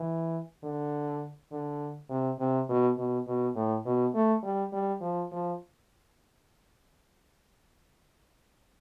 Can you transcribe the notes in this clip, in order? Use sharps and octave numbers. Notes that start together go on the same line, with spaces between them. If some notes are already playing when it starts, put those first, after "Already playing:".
Already playing: E3
D3
D3
C3
C3
B2
B2
B2
A2
B2
A3
G3
G3
F3
F3